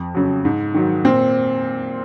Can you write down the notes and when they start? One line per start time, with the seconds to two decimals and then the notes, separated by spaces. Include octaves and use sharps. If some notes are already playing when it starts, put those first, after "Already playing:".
Already playing: F2
0.15 C#3 F#3
0.45 G#2
0.74 D#3 F#3
1.05 A#2 C4